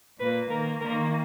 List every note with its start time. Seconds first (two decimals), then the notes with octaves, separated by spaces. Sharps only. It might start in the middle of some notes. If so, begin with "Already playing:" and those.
0.18 A#2 A#3 B4
0.50 D#3 A#3 A#4
0.80 D#3 A#3 A#4